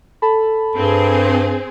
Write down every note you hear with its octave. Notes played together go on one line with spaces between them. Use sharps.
A4 A5 B5
G2 C4 G#4